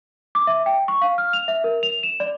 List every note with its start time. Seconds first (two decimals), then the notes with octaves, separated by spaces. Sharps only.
0.35 D6
0.47 E5
0.66 G5
0.88 C#6
1.02 F5
1.18 F6
1.33 F7
1.48 E5
1.64 A#4
1.83 F7
2.03 E7
2.20 D5